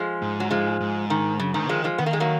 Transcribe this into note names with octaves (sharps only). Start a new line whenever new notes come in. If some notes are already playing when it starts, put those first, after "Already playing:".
Already playing: F3 G#3
G#2
F#3
F3 G#3
G#2
D#3
F#2 C#3
G#2 D#3
D#3 F3 G#3
F3 G#3
D#3 B3
A#3
G#3
F#3 A#3